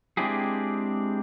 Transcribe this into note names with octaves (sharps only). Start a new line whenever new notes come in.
G#3 C4 D4 E4 G4 G#4